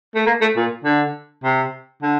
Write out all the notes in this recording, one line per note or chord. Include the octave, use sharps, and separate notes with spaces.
A3
A#3
A3
A#2
D3
C3
D3